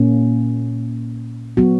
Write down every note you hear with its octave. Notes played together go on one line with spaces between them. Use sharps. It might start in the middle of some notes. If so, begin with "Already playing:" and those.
Already playing: A#2 A#3 C#4
F#3 B3 F#4